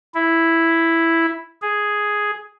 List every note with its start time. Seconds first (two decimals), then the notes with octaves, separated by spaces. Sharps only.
0.14 E4
1.62 G#4